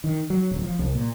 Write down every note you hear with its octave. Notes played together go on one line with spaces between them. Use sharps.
D#3
F#3
D1
F3
C2
A#2